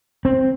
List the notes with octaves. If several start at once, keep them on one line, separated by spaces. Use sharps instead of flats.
C4